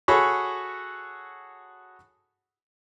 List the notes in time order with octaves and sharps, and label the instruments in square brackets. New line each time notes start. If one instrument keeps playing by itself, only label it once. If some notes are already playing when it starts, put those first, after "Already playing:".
[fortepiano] F#4 G#4 A4 C#5 B5